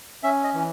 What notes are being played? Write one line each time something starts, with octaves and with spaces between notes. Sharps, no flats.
C#4 E5
D#5
E3